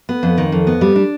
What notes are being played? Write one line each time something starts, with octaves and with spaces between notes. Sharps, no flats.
B3
F2
D#3
F2
B3
G3
D4